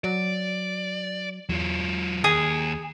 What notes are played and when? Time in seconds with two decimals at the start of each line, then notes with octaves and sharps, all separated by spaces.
0.04 F#3 D5
1.49 E2 F#3 F4
2.24 D#2 G#4